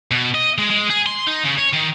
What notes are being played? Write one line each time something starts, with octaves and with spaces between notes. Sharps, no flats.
B2
D#5
G#3
G#3
G#4
C6
D#4
C#3
C#5
D#3